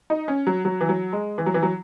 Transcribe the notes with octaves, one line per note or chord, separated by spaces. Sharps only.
D#4
C#4
F#3
F#3
E3
F#3
G#3
E3
F#3
E3
F#3